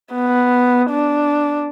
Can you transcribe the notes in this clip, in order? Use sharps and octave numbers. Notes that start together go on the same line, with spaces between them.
B3
D4